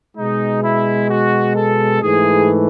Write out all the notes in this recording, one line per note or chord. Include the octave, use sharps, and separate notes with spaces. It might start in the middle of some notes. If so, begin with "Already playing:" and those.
B2 G#3 D#4
E4
F#4
A4
G#2 E3 A3 G#4